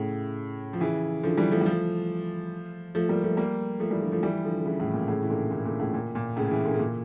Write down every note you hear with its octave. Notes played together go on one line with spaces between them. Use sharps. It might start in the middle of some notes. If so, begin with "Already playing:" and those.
Already playing: A2 C#3
F3
C#3 E3
D3 F3
E3 G3
F3 A3
G3
F3 A3
F3 A3
G3 A#3
F3 A3
G3 A#3
F3 A3
E3 G3
D3 F3
F3 A3
E3 G3
D3 F3
D3
C#3 E3
A2 C#3
A#2
A2 C#3
E3
A#2 D3
A#2 D3
A#2 D3
A2 C#3
A#2
A#2
A2 C#3
C#3 E3
A#2 D3
C#3
A#2